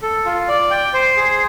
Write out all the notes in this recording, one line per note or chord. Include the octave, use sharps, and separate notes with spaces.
A4
F4
D5
G5
C5
G#4